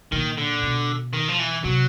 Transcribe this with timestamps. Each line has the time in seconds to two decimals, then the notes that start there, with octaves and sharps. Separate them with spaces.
0.12 A#2 D#3
0.38 D3
0.63 B2
1.13 D#3
1.28 F3
1.39 E3
1.64 C3 F#3